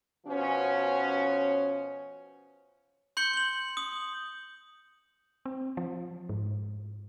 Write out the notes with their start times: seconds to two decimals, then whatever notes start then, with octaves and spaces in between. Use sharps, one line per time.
0.26 B2 F3 C#4
3.17 C6 G6 C#7 G7
3.33 G6 F#7
3.77 D#6
5.46 C4
5.77 F3
6.29 G#2